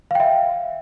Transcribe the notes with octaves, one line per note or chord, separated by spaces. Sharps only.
E5 F5 G5